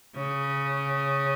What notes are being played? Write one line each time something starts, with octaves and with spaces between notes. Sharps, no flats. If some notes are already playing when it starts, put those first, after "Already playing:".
C#3